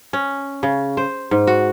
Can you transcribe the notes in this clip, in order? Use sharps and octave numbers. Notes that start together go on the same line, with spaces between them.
C#4
C#3
C5
G#2
F#4